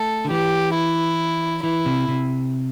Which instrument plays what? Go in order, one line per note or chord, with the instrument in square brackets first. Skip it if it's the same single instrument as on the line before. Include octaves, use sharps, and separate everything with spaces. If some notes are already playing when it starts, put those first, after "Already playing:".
Already playing: [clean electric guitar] A3 [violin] A4
[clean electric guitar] D3
[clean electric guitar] E3 [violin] G4
[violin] E4
[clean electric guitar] E3 [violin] E4
[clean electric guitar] C3
C3